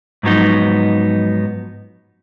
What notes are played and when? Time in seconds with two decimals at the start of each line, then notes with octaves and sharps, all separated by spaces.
0.23 G#2 F3 F#3 B3 D#4